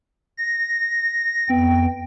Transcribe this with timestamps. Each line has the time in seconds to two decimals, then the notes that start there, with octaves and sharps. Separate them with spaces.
0.38 A#6
1.49 F2 B3 G5